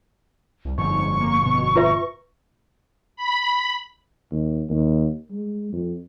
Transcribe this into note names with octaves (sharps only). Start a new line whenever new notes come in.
C2
G1 F2 G#2 C#6
A#3
B2
F4 B4 E5
B5
D#2
D#2
G#3
F2